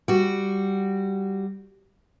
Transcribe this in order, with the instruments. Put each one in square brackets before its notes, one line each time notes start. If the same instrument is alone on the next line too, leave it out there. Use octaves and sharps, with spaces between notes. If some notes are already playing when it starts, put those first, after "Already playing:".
[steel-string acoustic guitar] G3 F#4